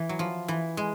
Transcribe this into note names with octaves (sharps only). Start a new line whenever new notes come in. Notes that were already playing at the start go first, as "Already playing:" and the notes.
Already playing: E3
F#3
F3
E3
G#3